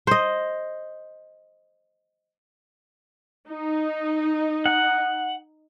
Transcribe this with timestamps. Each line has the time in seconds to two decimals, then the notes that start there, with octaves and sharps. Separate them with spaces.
0.07 C5 D#5
3.47 D#4
4.66 F#5